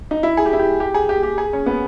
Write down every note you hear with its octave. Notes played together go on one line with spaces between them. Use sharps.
D#4
E4
G#4
G4
E4
G4
G4
G#4
G4
G4
G#4
C#4
B3